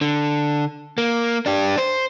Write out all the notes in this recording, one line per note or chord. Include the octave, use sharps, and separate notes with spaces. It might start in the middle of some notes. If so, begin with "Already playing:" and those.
D3
A#3
D4 G4
C5